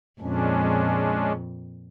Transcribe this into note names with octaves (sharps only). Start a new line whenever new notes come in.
F2 A#2 G#3 C#4 D4